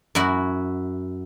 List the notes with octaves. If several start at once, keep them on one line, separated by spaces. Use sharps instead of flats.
F#2 E4 F#4